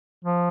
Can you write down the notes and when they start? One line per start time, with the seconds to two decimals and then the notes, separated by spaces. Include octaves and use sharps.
0.24 F3